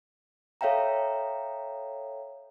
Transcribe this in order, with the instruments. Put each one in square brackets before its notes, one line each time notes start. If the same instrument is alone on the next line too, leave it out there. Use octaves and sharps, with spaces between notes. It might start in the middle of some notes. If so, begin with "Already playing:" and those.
[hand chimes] A4 C#5 E5 F5 G5 A#5